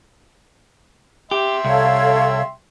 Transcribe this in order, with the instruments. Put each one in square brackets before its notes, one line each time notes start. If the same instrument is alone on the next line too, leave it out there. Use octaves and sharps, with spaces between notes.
[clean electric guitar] G4 [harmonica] E5 G5 C6
[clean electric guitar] C2 [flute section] A4 C#5 F5